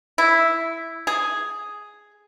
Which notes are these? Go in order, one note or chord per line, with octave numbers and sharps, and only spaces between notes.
E4
G#4